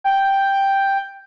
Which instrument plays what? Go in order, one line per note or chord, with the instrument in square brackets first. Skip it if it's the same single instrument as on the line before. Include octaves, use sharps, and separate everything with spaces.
[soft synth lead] G5